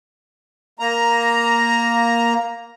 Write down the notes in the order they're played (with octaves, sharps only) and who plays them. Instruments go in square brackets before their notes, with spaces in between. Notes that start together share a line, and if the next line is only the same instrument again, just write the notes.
[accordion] A#3 A#5